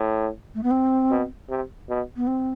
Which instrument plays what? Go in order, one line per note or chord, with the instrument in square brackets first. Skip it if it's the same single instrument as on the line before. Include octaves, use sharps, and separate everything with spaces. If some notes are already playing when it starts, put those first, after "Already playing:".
Already playing: [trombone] A2
[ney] A3
B3
C4
[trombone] B2
C3
B2
[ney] B3
C4